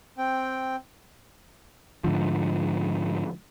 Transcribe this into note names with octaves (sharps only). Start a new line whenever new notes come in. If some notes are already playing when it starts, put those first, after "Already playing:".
C4 G5
G#2 D3 F3